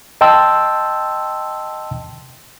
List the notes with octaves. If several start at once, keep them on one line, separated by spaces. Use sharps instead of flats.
D#5 G5 A5 C6 E6